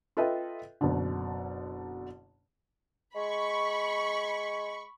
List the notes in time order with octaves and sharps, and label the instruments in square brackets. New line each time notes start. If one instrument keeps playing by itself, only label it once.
[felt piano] F4 A4 B4 D#5 E5 G5
F#1 B2 D3
[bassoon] G#3 [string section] B5 C#6